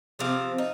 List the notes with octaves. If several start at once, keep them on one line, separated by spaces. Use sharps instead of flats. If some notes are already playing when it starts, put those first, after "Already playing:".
C3 F3 C4 F5
D#4